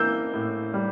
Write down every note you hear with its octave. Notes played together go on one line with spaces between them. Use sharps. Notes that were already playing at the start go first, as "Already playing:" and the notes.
Already playing: E3 A#3 E6 G6
A2
G3